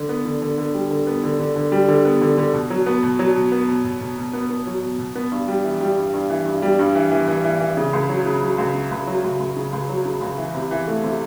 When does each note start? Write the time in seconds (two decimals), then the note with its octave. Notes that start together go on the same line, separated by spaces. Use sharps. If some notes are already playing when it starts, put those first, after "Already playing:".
Already playing: D3
0.09 B3
0.25 D3
0.42 D3
0.58 D3
0.74 G3
0.90 D3
1.07 B3
1.23 D3
1.39 D3
1.56 D3
1.72 G3
1.88 D3
2.05 B3
2.21 D3
2.37 D3
2.53 B2
2.70 F#3
2.86 B3
3.03 B2
3.19 F#3
3.35 B2
3.52 B3
3.68 B2
3.84 B2
4.01 B2
4.17 B2
4.33 B3
4.50 B3
4.67 F#3
4.82 B2
4.99 B2
5.15 B3
5.32 G2
5.48 G3
5.64 E3
5.81 G3
5.97 G2
6.13 G2
6.30 E3
6.46 G2
6.62 G3
6.79 G2
6.95 E3
7.11 E3
7.28 E3
7.44 E3
7.60 E3
7.77 C#3
7.93 C#2
8.09 F#3
8.26 C#3
8.42 F#3
8.58 C#2
8.74 C#3
8.91 C#2
9.07 F#3
9.24 C#2
9.40 C#2
9.56 C#3
9.73 C#2
9.89 F#3
10.05 C#3
10.21 C#2
10.38 E3
10.54 C3
10.71 E3
10.87 A3
11.03 C3